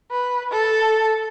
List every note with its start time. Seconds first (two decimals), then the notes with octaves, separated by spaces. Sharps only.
0.11 B4
0.51 A4